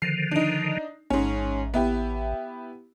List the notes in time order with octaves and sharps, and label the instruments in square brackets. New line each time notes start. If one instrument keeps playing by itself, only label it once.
[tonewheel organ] D3 D#3 F3 [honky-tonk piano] C7
[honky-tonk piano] D4 D#4
[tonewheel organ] A1 [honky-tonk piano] G#2 C#4
[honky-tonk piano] B3 E4 G4